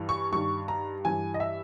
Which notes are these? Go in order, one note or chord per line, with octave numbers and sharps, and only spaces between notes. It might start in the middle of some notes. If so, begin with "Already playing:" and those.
Already playing: G2 E3
C#6
G2 D#3 C#6
A#5
G2 E3 G#5
D#5
E5